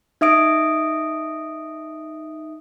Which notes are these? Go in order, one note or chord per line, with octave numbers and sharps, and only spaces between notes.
D#4 E5 D#6 D7